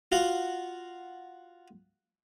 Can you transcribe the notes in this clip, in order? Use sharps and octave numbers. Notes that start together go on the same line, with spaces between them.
F4 F#4 F5 F#5